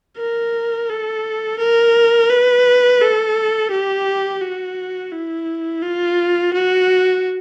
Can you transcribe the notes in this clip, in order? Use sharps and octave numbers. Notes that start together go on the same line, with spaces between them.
A#4
A4
A#4
B4
A4
G4
F#4
E4
F4
F#4